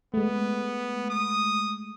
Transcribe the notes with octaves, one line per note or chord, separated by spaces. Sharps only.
G#3 A3 B3
D#6